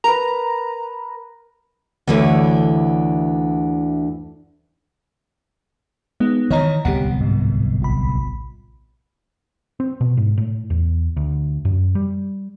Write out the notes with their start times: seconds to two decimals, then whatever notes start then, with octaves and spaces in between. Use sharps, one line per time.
0.04 A#4 B4 A#5
2.07 D2 D3 E3 E4 C#5
6.20 G#3 B3 D#4
6.51 D#3 E3 C#5 D#5 A#5
6.85 D1 C2 B3 G4 F#5
7.21 G#2
7.82 A#1 B5
9.80 C4
10.01 B2
10.17 G#2
10.38 A2
10.70 E2
11.17 D2
11.65 F#2
11.95 G3